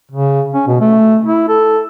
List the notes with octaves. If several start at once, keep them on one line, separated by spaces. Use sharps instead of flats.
C#3
C#4
B2
A3
E4
A4